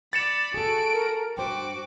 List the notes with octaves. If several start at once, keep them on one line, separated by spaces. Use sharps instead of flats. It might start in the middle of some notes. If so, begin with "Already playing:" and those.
D5 B5 A6 C#7 E7
F#4 G#4 A4 D7
A#4
G2 F#4 C5 G5 D6